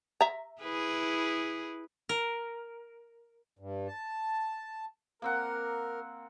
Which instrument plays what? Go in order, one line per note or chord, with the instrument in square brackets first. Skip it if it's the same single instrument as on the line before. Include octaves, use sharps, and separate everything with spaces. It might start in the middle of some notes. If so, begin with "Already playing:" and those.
[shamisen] E5 A#5
[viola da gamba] E4 G#4 B4
[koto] A#4
[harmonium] G2
A5
[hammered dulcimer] A#3 C4 F#5 [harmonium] A#4